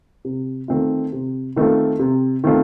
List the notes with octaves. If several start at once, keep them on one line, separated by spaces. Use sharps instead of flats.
C3
D#3 A3 C4 F4
C3
D#3 A3 C4 F4
C3
D#3 A3 C4 F4